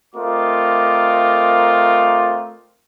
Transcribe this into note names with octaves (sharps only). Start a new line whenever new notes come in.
A3 C4 F4 A#4 D#5 D6